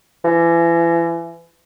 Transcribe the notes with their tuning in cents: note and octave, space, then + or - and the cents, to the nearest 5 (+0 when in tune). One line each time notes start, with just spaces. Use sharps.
E3 +35